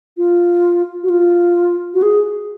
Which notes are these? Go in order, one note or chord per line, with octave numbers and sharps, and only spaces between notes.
F4
F#4
F4
F#4
G#4